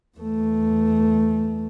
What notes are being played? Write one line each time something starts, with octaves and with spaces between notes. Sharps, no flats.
E2 A3